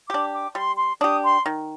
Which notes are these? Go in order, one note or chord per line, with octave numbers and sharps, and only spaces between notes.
D4 G4 D6
D6
G3 C6
C6
D4 G4 D#6
C6
D#3